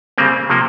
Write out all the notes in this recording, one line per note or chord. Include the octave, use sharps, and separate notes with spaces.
C#3 G3 A#3 C4
C3 F3 A#3